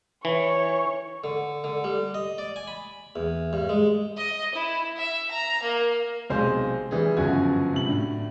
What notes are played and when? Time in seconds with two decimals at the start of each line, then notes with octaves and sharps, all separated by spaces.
0.25 E3 C#5 C#6
1.24 D3
1.64 D3
1.84 G3
2.14 D#5
2.38 D5
2.56 G#5
2.68 B5
3.16 E2
3.53 G2
3.69 G#3
4.17 D#5
4.55 E4
4.97 E5
5.31 A#5
5.63 A#3
6.30 B1 C3 G#3 C5 F5 G#5
6.91 E3 G3 G#4
7.17 G1 F#2 C#3 F3 F#4 G#6
7.73 C3 F#3 F#7
7.87 A2 D3